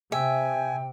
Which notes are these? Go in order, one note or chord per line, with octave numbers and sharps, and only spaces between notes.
C3 E5 G5 G#5